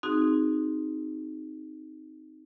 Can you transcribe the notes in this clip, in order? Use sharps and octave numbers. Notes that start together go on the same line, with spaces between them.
C4 D#4 F#4 G#4